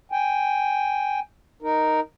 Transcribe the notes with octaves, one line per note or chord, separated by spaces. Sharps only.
G5 G#5
D#4 A#4